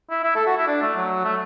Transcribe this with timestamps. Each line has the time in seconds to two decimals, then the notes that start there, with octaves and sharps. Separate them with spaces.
0.10 E4
0.24 E4
0.35 A4
0.47 F#4
0.56 E4
0.67 D4
0.82 A3
0.96 F#3
1.24 A3